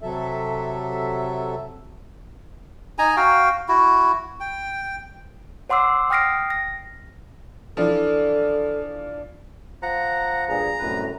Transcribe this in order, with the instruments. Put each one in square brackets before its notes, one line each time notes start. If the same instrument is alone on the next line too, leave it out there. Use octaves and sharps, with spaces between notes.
[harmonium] C3 F#3 A4 E5
[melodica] D#4 G#5 A#5
F#4 F5 G5
E4 F#4
G5
[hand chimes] C#5 F#5 C6 D6 E6 C7
G5 D#6 F6 A#6 C7 D7
A#6
[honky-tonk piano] E3 F3 [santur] D4 [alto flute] A4
[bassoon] F3 [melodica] F#5 A#5
[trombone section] G2 A#2 G#4 [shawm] A#5
[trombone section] C2 F#2 A2 [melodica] B4